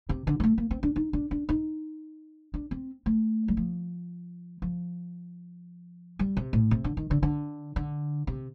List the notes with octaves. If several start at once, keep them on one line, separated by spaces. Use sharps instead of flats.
C3
D3
G3
A3
A#3
C4
D4
D#4
D4
D4
D#4
D4
C4
A3
G3
F3
F3
G3
C3
A2
C3
D3
D#3
D3
D3
D3
C3